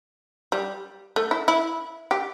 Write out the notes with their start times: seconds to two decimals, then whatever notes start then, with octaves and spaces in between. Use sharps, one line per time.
0.52 G3
1.16 A3
1.31 E4
1.48 E4
2.11 G4